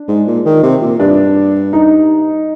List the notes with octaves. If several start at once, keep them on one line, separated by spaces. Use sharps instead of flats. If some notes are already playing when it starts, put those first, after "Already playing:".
Already playing: D4
G#2
A#2
D#3
C3
A#2
G2 D4
D#4